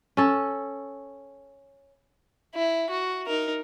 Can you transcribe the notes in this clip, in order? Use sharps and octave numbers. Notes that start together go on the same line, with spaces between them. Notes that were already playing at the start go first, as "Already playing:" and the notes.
C#4 A4
E4
F#4
D#4 A#4